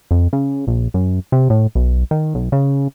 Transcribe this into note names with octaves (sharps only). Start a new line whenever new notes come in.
F2
C#3
A#1
F#2
C3
A2
B1
D#3
B1
C#3